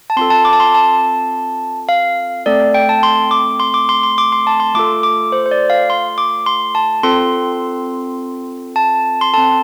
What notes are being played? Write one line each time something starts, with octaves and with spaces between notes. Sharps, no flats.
A5
C4 F4 A4 C6
A5
D6
A5
C6
A5
F5
A3 C4 A4 D5
G5
A5
C6
D6
C6
D6
C6
C6
D6
C6
A5
C6
A3 F4 A4 D6
D6
C5
C5
D5
F5
C6
D6
C6
A5
C4 F4 A4 C6
A5
C6
C4 A4 A5